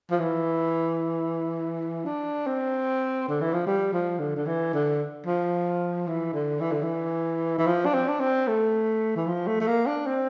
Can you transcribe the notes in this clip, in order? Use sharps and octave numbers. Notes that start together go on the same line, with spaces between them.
F3
E3
D4
C4
D3
E3
F3
G3
F3
D3
D3
E3
D3
F3
E3
D3
E3
D3
E3
E3
F3
D4
C4
D4
C4
A3
E3
F3
A3
A3
A#3
D4
C4